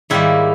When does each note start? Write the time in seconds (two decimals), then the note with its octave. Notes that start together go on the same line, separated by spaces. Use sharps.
0.10 G#2 D#3 G3 A#3 E4